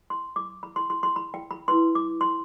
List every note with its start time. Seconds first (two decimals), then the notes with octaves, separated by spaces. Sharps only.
0.10 C6
0.36 D6
0.63 B5
0.76 C6
0.90 C6
1.03 C6
1.16 B5
1.34 G5
1.51 B5
1.68 E4 B4 C6
1.95 D6
2.21 C6